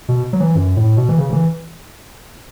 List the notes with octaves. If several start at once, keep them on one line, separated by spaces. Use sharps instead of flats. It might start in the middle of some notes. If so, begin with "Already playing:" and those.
B2
F#3
E3
F#2
A2
B2
E3
C#3
C#3
E3